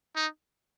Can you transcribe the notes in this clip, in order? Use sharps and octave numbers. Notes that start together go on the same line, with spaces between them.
D#4